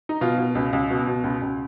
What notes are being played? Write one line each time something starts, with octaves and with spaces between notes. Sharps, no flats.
D#4
B2 F4
B2
C#2
C#2
B2
B2
C#2
C#2